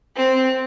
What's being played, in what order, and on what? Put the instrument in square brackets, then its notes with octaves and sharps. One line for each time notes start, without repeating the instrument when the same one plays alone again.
[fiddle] C4